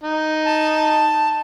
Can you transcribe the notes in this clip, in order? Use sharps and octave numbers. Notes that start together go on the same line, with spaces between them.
D#4
A5